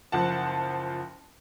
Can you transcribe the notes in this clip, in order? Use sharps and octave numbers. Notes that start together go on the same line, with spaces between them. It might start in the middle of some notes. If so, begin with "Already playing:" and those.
F#1 F3 F#5 A5